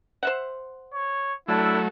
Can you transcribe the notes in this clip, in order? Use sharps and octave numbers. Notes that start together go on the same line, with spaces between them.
C5 E5 F#5
C#5
F#3 A3 D4 E4 A4 E6